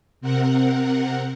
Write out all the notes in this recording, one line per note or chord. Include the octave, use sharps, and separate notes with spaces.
C3 C4 A#4 F#5